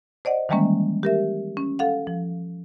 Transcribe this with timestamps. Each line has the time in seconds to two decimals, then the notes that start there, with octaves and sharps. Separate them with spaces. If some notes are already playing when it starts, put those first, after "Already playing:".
0.25 C5 D5 D#5 F#5
0.49 D#3 E3 G3 G#3 A#3 C#4
1.03 G4 A#4 E5
1.57 C#4
1.79 A4 F5 F#5
2.07 F3